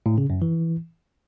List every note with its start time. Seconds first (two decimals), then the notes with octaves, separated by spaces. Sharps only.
0.06 A2
0.18 C#3
0.30 F#2
0.42 E3